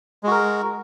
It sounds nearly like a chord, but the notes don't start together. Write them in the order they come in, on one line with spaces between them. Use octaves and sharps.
G#3 F#4 A#4